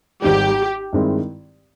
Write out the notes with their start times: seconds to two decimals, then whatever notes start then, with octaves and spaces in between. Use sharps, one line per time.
0.22 G#1 G#2 D#3 G3 G4
0.93 G2 D#3 G#3 C4 E4